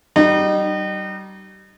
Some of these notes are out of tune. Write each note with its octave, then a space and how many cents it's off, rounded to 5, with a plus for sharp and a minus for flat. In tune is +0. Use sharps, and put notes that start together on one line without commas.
G3 -30 D#4 -30